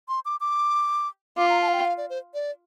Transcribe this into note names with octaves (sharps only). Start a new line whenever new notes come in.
C6
D6
D6
F4 D6
A#5
A5
F5
G5
F5
D5
C5
D5